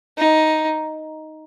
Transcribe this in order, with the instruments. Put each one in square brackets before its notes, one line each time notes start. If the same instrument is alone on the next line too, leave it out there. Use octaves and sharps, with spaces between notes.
[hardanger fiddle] D#4